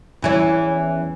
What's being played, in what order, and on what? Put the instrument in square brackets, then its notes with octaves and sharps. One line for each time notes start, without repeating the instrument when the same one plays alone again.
[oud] E2 E3 C#4